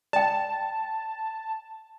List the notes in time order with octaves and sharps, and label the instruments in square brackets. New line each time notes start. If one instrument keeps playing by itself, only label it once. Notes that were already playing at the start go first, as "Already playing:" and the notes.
[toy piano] D5 G5 [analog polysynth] A5